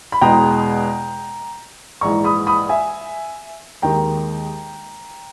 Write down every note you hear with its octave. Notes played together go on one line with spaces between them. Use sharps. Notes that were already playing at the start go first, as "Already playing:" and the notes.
B5
E2 B2 G#3 G5 A#5
A#1 G#2 E3 A#5 C#6
B5 D#6
B5 D#6
E5 G#5
D#2 D#3 G#3 G5 A#5